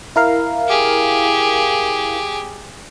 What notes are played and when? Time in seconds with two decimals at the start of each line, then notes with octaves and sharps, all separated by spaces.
0.16 E4 A#4 F5
0.68 G4 G#4